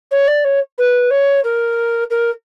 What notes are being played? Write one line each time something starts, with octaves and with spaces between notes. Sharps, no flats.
C#5
D5
C#5
B4
C#5
A#4
A#4